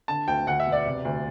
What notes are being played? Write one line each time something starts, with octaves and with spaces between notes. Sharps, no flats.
D3 A5
D2 G5
D2 F#5
E5
E1
D5
C3
D2